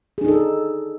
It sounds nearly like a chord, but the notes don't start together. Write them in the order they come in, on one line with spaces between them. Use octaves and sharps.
G#4 D4 D#4 A4